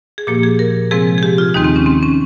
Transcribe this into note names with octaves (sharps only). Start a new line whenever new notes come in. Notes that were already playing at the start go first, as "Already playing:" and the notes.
G#4
A#2 F3 A#3 G4
G#4
A#4
C3 F3 G#3 C4 G#4
G#4
G4
F4
D#2 D#3 G#3 C4 D#4
C4
C#4
C4
C#4